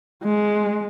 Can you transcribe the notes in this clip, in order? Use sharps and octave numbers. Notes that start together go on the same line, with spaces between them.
G#3